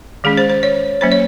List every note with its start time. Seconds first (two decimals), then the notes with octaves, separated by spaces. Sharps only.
0.24 D#3 G#3 C#4 G#4
0.37 C5
0.50 C5
0.63 C#5
1.01 F#3 A#3 C#4 C5
1.12 C#5